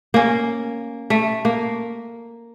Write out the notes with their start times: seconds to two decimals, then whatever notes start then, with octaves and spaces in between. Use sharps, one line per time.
0.14 A#3 C#4
1.10 A3
1.45 A#3